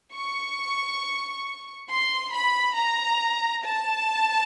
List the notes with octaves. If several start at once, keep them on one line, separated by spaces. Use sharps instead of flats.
C#6
C6
B5
A#5
A5